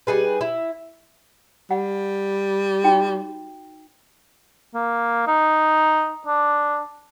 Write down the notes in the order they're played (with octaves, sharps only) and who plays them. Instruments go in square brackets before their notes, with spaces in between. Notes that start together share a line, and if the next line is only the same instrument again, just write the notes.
[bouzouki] G3 D#4 G#4 B4
E4
[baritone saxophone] G3 [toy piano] F#5
[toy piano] D#4 F#4 G5
[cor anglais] A#3
D#4
D4